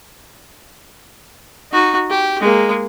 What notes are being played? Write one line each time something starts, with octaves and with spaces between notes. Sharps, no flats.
D#4 F#4
G4
G#3 A#3